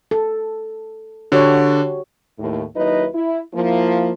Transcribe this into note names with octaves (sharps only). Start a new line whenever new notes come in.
A4
D3 D4 F#4 G4 C#5
D#2 A2
D#2 F#3 D#4 E4 B4 D#5
E4
F3 A#3 E4